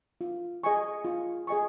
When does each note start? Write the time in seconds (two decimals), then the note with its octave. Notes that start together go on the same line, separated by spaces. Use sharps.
0.21 F4
0.63 G#4 D#5 G#5 C#6
1.05 F4
1.47 G#4 D#5 G#5 C#6